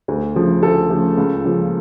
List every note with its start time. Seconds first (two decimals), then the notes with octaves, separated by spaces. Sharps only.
0.08 D2
0.35 C#3 F3 A3
0.63 D2 A4
0.90 C#3 F3 A3
1.17 C#2
1.45 C#3 F3 A#3